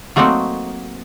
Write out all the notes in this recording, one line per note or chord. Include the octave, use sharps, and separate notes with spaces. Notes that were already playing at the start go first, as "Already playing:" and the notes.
F#3 A3 A#3 C4 D#4 F#4